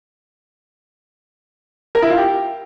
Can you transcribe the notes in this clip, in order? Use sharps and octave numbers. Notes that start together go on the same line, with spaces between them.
A#4
E4
F4
G4